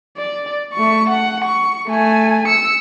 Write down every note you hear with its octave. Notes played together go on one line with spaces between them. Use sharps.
D5
A3 C#6
F#5
C#6
A3 G#5
E6 C#7